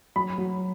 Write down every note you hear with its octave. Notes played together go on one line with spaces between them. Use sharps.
F#3 B5
F#3